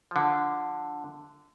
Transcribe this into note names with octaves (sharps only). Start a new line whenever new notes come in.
D3 F3